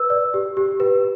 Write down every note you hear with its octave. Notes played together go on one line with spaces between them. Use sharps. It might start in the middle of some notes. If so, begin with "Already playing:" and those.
Already playing: B4 E6
D5
G4
G4
B4